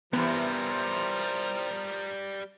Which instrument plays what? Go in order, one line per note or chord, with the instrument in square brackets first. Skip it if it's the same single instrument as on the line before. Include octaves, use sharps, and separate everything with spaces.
[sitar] C3 E3 [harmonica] F3 A#4 [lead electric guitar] G3 B4 [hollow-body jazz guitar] B3